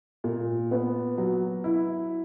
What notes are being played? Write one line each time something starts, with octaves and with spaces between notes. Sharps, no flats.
A#2
B3
F#3
E4